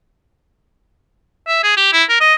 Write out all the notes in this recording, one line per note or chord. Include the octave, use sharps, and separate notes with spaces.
E5
G#4
G4
E4
A#4
D#5